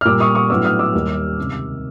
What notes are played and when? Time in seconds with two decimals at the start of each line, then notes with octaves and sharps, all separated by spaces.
0.01 F6
0.05 A#2 G3 A#3 D6 E6
0.20 C#6 D#6
0.35 C#6 D#6
0.50 A2 F#3 B3 D4 D6 E6
0.64 D#6 F6
0.79 D6 E6
0.94 D#2 D#3 G3
1.38 C#2 C3 D#3